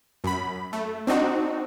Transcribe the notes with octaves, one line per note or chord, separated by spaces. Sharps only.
F#2 B5
A3
C4 D4 D#4 F#4